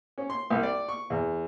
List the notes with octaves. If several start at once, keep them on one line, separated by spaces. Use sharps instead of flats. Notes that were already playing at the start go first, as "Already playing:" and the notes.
C#4
C6
C2
D5
C#6
E2